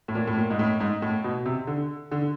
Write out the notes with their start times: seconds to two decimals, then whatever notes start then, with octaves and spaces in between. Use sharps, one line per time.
0.08 A2
0.15 A#2
0.27 A2
0.38 A#2
0.50 G#2
0.59 A2
0.80 G#2
1.02 A2
1.24 B2
1.46 C3
1.67 D3
2.11 D3